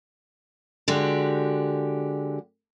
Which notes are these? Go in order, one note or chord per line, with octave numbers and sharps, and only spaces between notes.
D3 G#3 F#4 G4